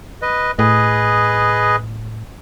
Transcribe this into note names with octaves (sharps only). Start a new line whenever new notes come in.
B4 D#5
A2 G#4 B4 D#5